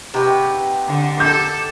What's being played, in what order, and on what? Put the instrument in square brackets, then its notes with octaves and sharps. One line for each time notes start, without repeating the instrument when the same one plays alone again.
[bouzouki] C3 B4 [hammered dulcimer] D#4 F#4 G4
[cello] D3
[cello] A4 [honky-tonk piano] D6 G6